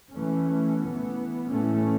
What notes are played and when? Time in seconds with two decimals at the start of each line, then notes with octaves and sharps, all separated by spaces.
0.14 E3 A3 C#4
0.81 E3 B3
1.49 A2 E3 A3 C#4